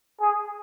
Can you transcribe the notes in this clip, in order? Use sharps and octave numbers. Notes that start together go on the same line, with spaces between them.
G#4